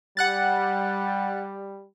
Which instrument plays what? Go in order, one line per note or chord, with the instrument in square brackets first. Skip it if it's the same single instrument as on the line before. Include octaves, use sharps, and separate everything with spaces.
[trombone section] G3 [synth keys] F#5 F#6 A6